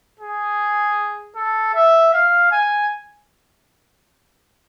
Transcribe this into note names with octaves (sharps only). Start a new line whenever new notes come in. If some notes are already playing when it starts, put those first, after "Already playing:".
G#4
A4
E5
F5
G#5